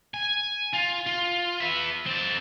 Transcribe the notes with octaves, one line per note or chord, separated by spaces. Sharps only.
G#5
F4
F4
B3 E5
C4 A5